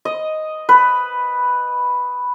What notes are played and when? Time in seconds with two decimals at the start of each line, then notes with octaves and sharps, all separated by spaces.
0.05 D#5
0.69 B4